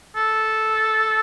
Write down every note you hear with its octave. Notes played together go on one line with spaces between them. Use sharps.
A4